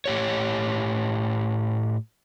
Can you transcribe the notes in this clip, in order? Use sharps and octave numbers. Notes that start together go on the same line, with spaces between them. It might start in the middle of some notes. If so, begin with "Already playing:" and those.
A2 G4 C#5